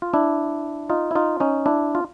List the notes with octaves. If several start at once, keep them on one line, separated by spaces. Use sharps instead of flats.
F4
D4 E4
D#4 F4
E4
D#4 F4
C#4 D#4
D4 E4
F4